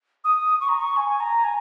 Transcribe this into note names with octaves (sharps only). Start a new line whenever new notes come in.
D#6
C#6
A#5
C#6
G#5
A#5
G#5